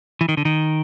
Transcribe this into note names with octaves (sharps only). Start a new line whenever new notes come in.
E3
D#3
D3
D#3